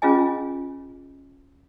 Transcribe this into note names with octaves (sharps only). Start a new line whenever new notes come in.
C#4 F4 G#4 D#5 G#5